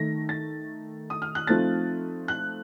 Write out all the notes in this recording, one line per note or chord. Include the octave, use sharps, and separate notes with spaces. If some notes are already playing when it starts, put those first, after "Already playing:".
Already playing: D#3 A3 D#4 A#6
A6
D#6
F6
F#6
F3 A3 C4 D#4 A6
F#6